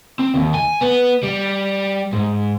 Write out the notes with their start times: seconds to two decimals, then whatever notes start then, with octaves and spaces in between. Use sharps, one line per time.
0.19 C4
0.34 D#2
0.54 G#5
0.81 B3
1.23 G3
2.13 G#2